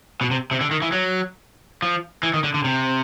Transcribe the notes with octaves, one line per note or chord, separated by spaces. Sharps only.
B2
C3
C3
D3
D#3
E3
F#3
F3
E3
D#3
D3
D3
C3